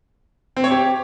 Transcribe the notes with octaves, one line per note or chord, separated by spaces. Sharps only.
C4
C#5
G4